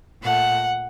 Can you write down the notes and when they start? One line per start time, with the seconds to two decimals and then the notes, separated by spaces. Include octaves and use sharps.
0.23 A#2 A3 F#5